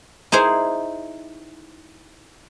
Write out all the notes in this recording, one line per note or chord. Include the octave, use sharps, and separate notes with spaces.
D#4 E4 G#4 C5